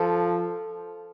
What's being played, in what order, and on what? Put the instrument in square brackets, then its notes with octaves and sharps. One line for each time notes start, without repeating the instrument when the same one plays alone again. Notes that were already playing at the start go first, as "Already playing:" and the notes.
Already playing: [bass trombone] F3 [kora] A4